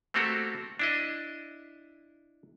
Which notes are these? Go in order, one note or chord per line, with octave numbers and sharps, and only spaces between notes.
A3 A#3 C4 F#4 G4 A4
D4 E4 D#5